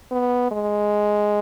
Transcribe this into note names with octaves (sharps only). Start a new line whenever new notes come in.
B3
G#3